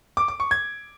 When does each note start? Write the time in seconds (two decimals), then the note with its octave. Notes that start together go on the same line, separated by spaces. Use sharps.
0.17 D6
0.28 D6
0.40 C#6
0.51 G#6